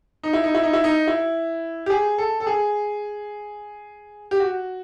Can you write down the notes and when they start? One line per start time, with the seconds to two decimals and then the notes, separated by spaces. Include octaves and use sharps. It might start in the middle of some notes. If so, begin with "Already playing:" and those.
0.23 D#4
0.33 E4
0.44 D#4
0.54 E4
0.63 D#4
0.73 E4
0.84 D#4
1.07 E4
1.86 G4
1.90 G#4
2.18 A4
2.40 A4
2.47 G#4
4.31 G4
4.40 F#4